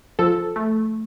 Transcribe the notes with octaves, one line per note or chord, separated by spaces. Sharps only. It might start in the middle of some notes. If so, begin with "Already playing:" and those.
F3 A4
A3